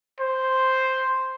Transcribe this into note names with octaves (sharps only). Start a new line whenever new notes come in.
C5